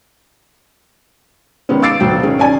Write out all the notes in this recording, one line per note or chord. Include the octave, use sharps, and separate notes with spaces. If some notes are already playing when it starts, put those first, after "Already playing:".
D#3 G#3 B3 C#4
F5 D6 E6 A6 C7 D7
D2 B2 F#3 G5
D#3 C#4 G#4
C#4 D5 G#5